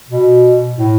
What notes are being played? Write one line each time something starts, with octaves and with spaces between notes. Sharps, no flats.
B2
A2